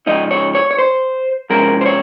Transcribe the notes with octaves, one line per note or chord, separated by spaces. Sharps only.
C#3 F3 G#3 D#4 D#5
C#5
C#5
C#5
C5
C3 F3 G#3 C#4 A#4
C5
C#5